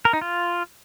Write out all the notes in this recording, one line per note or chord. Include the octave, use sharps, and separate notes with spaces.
A#4
D#4
F4